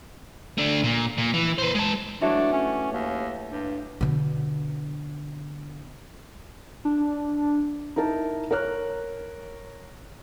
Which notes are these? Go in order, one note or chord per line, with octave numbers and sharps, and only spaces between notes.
A3 D4
A#2
A#2
E3
B4 C5
G#3 A5
E3 F#3 A3 D4
C#4
D#2
G2
B2 D3
D4
D#4 E4 A#4 A5
A#4 C#5 F6 F#6